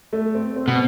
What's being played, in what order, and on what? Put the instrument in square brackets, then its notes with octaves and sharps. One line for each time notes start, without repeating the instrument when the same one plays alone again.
[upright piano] A3
C4
C4
[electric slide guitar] B2